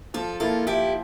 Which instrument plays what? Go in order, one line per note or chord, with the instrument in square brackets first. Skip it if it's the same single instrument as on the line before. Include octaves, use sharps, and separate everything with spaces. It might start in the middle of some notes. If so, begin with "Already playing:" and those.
[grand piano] F3 [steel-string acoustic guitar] F4 A4
[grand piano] A#3 E4 [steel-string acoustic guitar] F4 A4
[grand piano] F3 [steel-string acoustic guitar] E4 G4